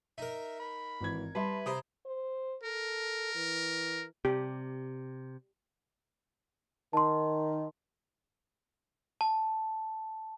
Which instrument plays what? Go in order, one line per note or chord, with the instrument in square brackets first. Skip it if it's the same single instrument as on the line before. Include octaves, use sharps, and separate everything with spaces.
[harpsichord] D#4 A#4 [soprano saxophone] E5
[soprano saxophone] B5
[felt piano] G#1 E3 G#6
[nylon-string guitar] G3 E5 [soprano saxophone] B4 [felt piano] A5 B5 C6
[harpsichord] C3 C5 [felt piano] A#5 B5 D#6
[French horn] C5
[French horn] A4 [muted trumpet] A#4
[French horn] E3
[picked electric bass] C3 [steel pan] G4
[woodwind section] D#3 [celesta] A5 C6
[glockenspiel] A5